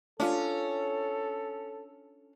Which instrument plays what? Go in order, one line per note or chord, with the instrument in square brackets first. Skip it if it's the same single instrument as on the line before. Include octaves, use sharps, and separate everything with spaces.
[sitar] C#4 [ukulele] D4 F4 [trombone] A4